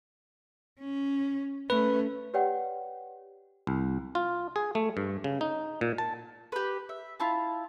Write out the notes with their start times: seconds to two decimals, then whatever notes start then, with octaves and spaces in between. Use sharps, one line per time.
0.80 C#4
1.70 A3 C#4 B4
2.34 G4 B4 C#5 D5 F#5 G5
3.67 C2
4.15 F4
4.56 G#4
4.75 A3
4.97 G2
5.24 C#3
5.41 D#4
5.81 A#2
5.98 A5
6.52 G4 B4
6.89 E5
7.20 E4 F4 A5